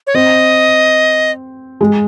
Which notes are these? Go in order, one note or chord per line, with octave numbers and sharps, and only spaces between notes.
C#5
C4 D#5
G#3